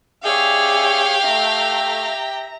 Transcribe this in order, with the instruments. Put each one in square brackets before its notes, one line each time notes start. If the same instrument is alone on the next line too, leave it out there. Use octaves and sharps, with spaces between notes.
[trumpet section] C#4 D5 E5 [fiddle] G4 G5 [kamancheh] G#4 C#5 [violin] F5
[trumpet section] A3 [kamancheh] E5 A#5